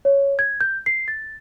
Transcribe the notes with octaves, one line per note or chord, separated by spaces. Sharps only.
C#5
G#6
G6
C7
A6